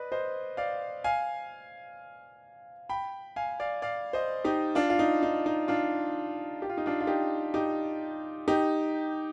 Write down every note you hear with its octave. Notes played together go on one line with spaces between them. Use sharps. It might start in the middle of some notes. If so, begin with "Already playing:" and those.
Already playing: B4 D5 D#5
C5 D#5
D5 F5
F5 G#5
G5 B5
F5 G#5
D5 F5
D5 F5
C5 D#5
D#4 G4
D4 F4
F4
D#4
D#4
D#4
D4 F4
G4
F4
D#4
D4 F4
F4
D#4 G4
D#4 G4
D#4 G4